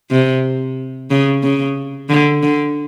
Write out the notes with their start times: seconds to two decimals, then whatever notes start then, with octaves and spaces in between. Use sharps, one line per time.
0.11 C3
1.10 C#3
1.43 C#3
2.09 D3
2.43 D3